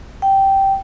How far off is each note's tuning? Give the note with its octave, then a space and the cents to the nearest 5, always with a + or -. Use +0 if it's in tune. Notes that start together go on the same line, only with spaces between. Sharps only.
G5 -10